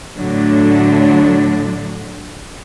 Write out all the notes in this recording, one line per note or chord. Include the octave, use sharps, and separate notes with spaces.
A2 D3 F#3 D4